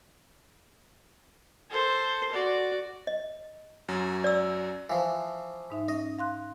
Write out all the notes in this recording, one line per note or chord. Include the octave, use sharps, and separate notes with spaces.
A4 C5
F#4 D5
D#5
F#2 F#3
D5 E6
E3 F3 F5
G#2 D#4 E5
C#4 D#5
F5 C6 F#6